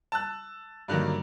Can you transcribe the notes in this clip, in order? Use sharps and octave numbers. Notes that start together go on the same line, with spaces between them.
A5 E6 F#6
G2 D3 D#3 F#3 A#3